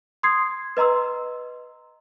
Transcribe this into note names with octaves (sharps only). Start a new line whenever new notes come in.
C6 D#6 G#6 C7
B4 D#5 A#5 C6 E6